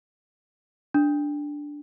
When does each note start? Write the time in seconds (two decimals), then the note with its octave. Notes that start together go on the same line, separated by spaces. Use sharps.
0.94 D4